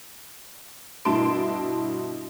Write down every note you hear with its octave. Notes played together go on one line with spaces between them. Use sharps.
G2 B2 E4 A5 C6 D7